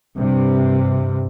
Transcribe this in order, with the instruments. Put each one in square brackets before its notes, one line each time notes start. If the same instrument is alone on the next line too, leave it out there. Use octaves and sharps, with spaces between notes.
[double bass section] G2 C3